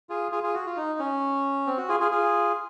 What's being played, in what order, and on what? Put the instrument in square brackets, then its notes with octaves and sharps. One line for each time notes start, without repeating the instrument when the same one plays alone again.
[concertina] F4 G#4
F4 G#4
F4 G#4
F#4
F4
D#4
C#4
C4
F#4
F4 G#4
F4 G#4
F4 G#4